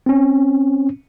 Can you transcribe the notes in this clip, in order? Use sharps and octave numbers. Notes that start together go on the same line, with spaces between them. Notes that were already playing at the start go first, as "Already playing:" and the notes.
C4 C#4